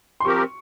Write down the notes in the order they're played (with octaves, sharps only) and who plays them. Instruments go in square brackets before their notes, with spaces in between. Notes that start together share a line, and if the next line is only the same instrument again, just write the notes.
[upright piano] C6
[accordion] F3 C4 G4 A#4 [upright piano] C#6